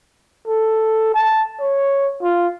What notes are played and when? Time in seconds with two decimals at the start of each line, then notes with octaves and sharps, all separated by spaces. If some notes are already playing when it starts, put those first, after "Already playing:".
0.47 A4
1.14 A5
1.61 C#5
2.22 F4